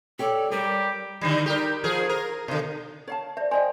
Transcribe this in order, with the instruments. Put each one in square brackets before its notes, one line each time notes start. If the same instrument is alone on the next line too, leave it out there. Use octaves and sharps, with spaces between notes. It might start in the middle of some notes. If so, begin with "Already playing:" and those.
[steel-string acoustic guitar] G4 C#5 D5 [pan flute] A4
[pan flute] G3 [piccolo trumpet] G4 [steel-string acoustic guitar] A#4
[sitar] D3 D#3 G3
G4 A#4
F3 G#4 A#4
A#4
B2 D3
[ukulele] C#5 F5 A5
[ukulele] C5 [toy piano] D5 E5
[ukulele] C5 D#5 G5 [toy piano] D5 C6 [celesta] G#5